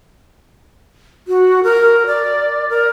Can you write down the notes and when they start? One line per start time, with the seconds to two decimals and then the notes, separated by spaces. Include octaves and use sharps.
1.28 F#4
1.64 A#4
2.07 D5
2.69 A#4